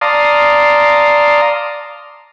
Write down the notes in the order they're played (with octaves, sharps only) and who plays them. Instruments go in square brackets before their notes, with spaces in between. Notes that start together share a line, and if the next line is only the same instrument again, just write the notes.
[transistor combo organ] D5 F5 A5 A#5 C6 D#6